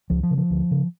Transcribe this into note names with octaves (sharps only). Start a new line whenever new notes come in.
C#2 F3
F3
C#3
F3
D2
C#3